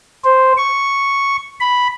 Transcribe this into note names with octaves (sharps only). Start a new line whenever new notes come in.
C5
C#6
B5